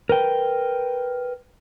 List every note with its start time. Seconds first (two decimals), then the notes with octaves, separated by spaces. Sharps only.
0.09 A#4 B4 G5